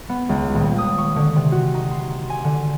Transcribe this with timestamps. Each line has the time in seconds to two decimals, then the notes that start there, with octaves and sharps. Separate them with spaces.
0.09 B3
0.29 C#2
0.54 D#1
0.78 D#6
0.98 C#6
1.16 D3
1.36 C3
1.52 F#4
1.74 D#4
1.91 C6
2.30 G#5
2.44 D3